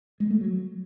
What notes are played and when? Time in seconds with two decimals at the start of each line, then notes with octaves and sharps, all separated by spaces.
0.20 G#3
0.30 A3
0.41 F#3